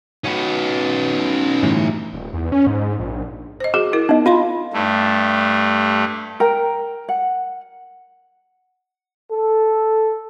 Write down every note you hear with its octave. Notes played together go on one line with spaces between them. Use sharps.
C#4 D#4 F#4 B4
G1 A2 E3
D#1
E2
C#4
G#2
A#1
C5 D#5
F#4 G#4 D6
E4 A#4
B3 D#4 D#5
F4 F5 B5 C6
G2 A3
A#4 G5
F#5
A4